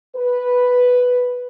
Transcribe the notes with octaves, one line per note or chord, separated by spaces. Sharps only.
B4